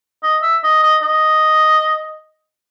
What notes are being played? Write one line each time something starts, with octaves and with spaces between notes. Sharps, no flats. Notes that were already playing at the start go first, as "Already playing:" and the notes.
D#5
E5
D#5
D#5
D#5